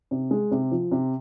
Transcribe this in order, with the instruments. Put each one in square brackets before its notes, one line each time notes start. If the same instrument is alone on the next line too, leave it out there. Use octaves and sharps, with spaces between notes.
[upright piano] C3
G#3
C3
F3
C3